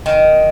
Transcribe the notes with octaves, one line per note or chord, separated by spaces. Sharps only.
D#3